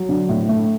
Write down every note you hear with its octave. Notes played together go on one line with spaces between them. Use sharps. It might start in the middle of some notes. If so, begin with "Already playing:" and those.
Already playing: F#3
D3
A2
A3